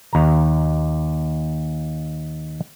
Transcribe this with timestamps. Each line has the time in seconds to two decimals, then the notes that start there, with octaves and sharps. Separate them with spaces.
0.13 D#2 A#5